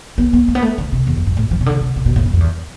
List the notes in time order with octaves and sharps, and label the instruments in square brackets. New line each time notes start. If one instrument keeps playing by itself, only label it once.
[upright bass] B3
B3
A3
B3
A3
D3
C3
E2
F2
G2
A2
F3
C3
D3
C3
C3
B2
A2
G2
F2
E2